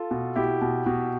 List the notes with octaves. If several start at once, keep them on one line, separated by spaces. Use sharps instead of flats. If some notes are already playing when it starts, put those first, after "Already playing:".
Already playing: F4 A4
B2
B2 E4 G4
B2
B2